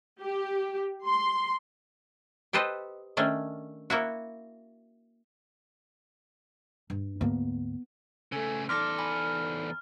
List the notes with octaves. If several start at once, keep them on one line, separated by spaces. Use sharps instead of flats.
G4
C6
G4 A4 B4 C5 D#5
D#3 A3 C#4 D4
A#3 E4 F#4
G2
D2 G#2 A#3 B3
C#3 A3 A4 G#5 G#6
E2 D#4 A4 D5 C6 D6 F6 A#6
G#5 B5